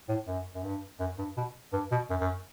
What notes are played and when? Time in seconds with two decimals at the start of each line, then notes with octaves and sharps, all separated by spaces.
0.09 A2
0.27 F#2
0.55 F#2
0.63 G2
1.00 F#2
1.18 G2
1.37 B2
1.73 G2
1.91 B2
2.10 F#2
2.20 F#2